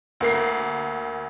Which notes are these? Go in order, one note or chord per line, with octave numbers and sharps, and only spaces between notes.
D2 A#3 C7